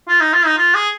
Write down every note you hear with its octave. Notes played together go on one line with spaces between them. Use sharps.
F4
D#4
F4
D#4
F4
G#4